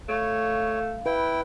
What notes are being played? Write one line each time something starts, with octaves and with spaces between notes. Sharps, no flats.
A3 C#5 F5
E4 B4 G5